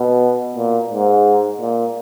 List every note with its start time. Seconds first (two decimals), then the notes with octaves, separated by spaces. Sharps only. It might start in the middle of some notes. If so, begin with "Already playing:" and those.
Already playing: B2
0.56 A#2
0.91 G#2
1.61 A#2